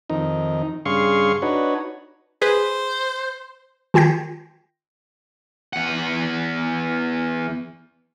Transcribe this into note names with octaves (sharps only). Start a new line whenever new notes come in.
F2 D#3 D#4
G2 C#3 G#4 F5 C6 C#6
D4 D#4 F#4 B4 C#5
G#4 B4 C5
D#3 F4 G5 G6 A#6
E2 F#5